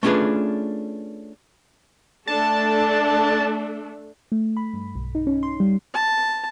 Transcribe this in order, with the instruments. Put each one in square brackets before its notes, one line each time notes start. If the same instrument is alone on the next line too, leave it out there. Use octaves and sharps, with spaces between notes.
[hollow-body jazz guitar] A3 C#4 D4 F4 G#4 B4
[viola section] A3 D4 A4 [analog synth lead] A5
[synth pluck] A3
B5
G2
B1
D#4
C#4
C6
G3
[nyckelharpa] A5